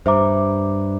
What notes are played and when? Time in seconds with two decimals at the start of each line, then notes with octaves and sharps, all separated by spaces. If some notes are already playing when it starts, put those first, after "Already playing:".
0.06 G2 C5 E5 A#5 D6